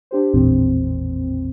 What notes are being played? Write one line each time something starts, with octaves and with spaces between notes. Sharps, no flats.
D4 G4 C5
A1 E2 A#2 D#3 C4